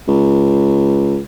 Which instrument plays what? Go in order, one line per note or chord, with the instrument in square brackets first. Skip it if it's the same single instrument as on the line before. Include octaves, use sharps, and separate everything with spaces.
[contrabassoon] C#2